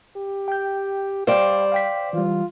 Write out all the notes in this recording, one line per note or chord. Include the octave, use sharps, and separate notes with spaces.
G4
G5 G6
G3 C5 D5 F5 G5
F5 G5 B6
E3 G3 F4